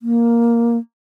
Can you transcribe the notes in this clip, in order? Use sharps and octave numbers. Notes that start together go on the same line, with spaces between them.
A#3